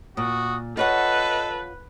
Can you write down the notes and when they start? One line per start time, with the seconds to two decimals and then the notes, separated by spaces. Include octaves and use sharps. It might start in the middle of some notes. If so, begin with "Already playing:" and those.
0.17 A#2 F#4 D#6
0.77 F4 A4 B4 C#5 D#5 F#5